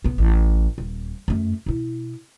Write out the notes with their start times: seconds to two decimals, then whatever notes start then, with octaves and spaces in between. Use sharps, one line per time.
0.04 B1 B3
0.18 A1
0.78 D#1
1.28 F#2 A3
1.66 B2 E4